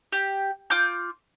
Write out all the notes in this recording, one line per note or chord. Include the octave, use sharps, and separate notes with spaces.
G4
F4 D6 G6